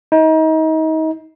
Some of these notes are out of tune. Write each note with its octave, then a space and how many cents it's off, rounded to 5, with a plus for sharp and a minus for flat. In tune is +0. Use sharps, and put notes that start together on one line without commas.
D#4 +30